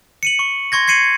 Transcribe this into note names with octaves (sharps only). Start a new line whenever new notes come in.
C#7 D#7 F#7
C#6
C6 C#6 G#6 A#6
G#6 C7 C#7 D#7 F#7